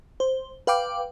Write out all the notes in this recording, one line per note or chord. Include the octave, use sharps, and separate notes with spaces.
C5
B4 F5 G5 D6